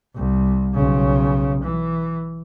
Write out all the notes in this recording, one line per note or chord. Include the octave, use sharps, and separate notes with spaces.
C2
B1 C#3
E3